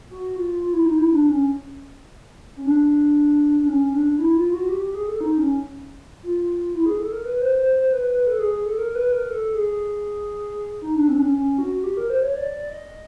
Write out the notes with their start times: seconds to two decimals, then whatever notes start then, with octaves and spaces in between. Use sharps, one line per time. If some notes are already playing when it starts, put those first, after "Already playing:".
0.10 F#4
0.36 F4
0.61 F4
0.73 E4
0.86 D#4
0.98 E4
1.12 D4
1.29 C#4
2.57 C#4
2.66 D4
3.60 D4
3.67 C#4
3.93 D4
4.19 E4
4.36 F4
4.53 F#4
4.69 G4
4.82 G4
4.95 G#4
5.08 A4
5.21 D#4
5.37 C#4
6.23 F4
6.74 E4
6.86 G#4
7.00 A4
7.12 A#4
7.25 B4
7.41 C5
7.58 C5
7.76 C5
7.92 B4
8.09 B4
8.27 A4
8.39 G#4
8.53 G#4
8.66 A4
8.78 A#4
8.89 A#4
8.95 B4
9.12 A#4
9.29 A4
9.55 G#4
10.82 D#4
10.95 D4
11.08 C4
11.15 D4
11.20 C#4
11.33 C#4
11.58 F#4
11.74 F#4
11.84 G4
11.97 A#4
12.10 C5
12.23 C#5
12.36 D5
12.53 D5
12.70 D#5